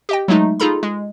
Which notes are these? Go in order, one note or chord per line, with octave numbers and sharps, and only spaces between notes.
G4 D#5 G5
F#3 G#3 A3 D#4
D#4 F4 G#4 A4 A#5 B5
G#3